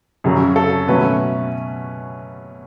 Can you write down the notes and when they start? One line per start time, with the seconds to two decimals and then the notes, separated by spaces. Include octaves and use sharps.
0.24 F#2 C#3 F#3 C#4
0.56 A4
0.88 B2 F#3 A3 C#4 B4